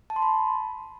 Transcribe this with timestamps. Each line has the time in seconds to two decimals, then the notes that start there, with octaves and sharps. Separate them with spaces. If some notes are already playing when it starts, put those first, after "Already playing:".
0.10 A5
0.16 C6
0.22 B5